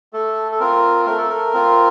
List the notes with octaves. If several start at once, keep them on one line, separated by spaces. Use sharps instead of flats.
A3 A4
A4
C4 F4 A#4
A3 A#4
A4
A#4
C4 F4